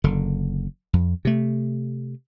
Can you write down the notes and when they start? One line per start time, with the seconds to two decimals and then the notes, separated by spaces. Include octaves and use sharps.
0.04 F#1 D3
0.93 F2
1.25 C3 A3